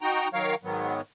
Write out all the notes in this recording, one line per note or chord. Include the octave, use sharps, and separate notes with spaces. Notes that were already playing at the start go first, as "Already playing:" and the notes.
D#4 F#4 G5 A#5
D#3 F#3 A#4 C#5 F5
G#2 D#3 F#3 B3